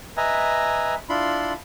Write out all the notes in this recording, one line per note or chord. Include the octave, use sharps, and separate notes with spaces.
B4 D#5 E5 G#5 A#5
D4 E4 F4 B5 C6